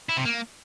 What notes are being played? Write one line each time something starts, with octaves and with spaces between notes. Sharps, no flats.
E4
C3
A#3